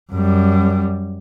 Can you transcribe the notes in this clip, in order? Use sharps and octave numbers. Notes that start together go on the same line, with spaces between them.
F#2 G3